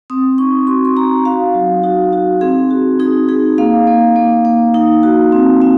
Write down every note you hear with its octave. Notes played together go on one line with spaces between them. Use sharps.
C4 D#6
D#4 C#6
F#4 C6
C6
D#4 A#5
F#4 F5
F#3
D#4 F#4
D#4 F#4
C4 G#4
F#4
D#4 G#4
D#4 G#4
A#3 F5
A#3
A#3
A#3
D#4
F#4
C4
C4